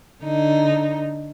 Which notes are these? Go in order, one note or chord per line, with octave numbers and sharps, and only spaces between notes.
D3 D#4